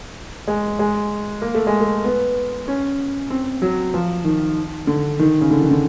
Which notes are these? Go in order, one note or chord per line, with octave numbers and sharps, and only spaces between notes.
G#3
G#3
A#3
A3
G#3
A3
B3
C#4
C4
F#3
F3
D#3
D3
D#3
C#3
D3
D#3
D3